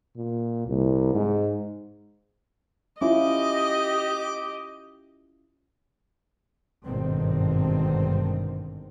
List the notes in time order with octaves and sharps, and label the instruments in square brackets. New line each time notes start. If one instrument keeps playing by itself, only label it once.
[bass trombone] A#2
C2
G#2
[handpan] C#4 E4 F4 [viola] G4 D#5 [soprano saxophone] D6
[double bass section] G#1 G2 B2 D3 D#3 C4